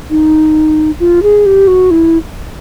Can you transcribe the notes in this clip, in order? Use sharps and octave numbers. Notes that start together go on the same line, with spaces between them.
D#4
F4
G#4
G4
F#4
E4